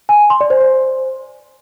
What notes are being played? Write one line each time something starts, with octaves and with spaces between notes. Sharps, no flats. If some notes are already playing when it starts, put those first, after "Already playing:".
G#5
C6
D5
C5
C5